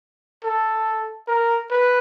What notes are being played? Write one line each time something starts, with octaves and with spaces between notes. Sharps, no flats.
A4
A#4
B4